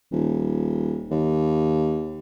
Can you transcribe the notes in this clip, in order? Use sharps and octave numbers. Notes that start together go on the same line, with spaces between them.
D#1
D#2